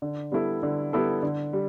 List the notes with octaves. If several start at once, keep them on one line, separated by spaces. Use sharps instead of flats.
D3
G3 B3 E4 A4
D3
G3 B3 E4 A4
D3
G3